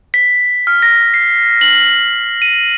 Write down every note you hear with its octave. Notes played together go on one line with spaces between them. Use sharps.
B6
F6
A#6
C7
F#7
D#7